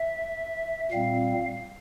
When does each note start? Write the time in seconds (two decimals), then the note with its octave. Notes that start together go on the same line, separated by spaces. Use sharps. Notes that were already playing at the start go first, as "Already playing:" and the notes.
Already playing: E5
0.91 A#2 G3 C4 F5